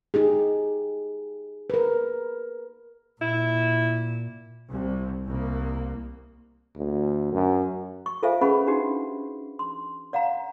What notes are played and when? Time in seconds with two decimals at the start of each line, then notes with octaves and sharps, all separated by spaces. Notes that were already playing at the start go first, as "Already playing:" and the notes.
0.14 D#4 G4 G#4
1.70 A#4 B4
3.21 A#2 E4
4.70 C2
5.26 C2 A#3
6.76 D2
7.32 F#2
8.06 C#6
8.23 F4 A4 C5 E5 F5 G#5
8.41 C#4 G#4 B4 F#5 B5 C#6
8.67 D4 D#4 F#4 G4
9.59 C6
10.13 D5 F5 F#5 A#5